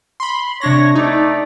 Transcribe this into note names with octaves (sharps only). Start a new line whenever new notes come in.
B5 C6
C3 D4 C#5 A#6
A3 D#4 D5